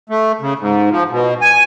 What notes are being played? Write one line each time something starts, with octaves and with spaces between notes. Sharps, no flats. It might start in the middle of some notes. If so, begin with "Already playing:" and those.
A3
C#3
G#2
F3
B2
G#5